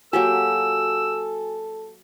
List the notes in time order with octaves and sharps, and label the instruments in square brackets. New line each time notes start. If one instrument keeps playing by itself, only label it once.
[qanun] F#3 A#3 G4 [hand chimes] F#4 G#5 [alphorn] A4 [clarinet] E6